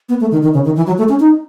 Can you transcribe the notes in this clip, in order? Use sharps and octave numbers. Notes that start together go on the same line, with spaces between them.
B3
A3
D#3
D#3
C#3
D#3
E3
F#3
A3
C#4
D#4